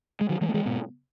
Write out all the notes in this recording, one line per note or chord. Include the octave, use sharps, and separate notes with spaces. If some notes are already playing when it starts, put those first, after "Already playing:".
G#3
D#3 F#3
E3 G#3
A3
E3 G#3
G#2 B2